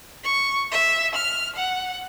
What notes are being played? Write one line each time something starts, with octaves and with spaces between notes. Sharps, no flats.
C#6
E5
F6
F#5